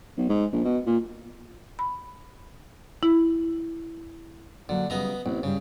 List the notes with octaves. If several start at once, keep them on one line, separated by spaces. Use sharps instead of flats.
B1
G#2
A#1
B2
A#2
B5
E4
D3 F#3 A#3
C#3 F#3 G3 B3 D#5 A#5
A1 B3 C4 E4
G2 C#3 G3